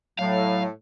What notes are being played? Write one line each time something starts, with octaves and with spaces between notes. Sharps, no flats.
A2 F#3 F5